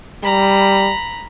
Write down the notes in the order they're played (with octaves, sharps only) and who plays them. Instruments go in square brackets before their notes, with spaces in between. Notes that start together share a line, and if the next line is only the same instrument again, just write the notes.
[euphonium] G3 [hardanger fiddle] A#5 B5